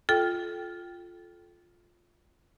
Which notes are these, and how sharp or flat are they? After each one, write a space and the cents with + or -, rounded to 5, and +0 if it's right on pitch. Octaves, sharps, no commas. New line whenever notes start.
F4 +0 A4 -25 G5 +0